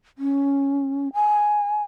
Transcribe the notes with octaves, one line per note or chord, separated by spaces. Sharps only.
C#4
G#5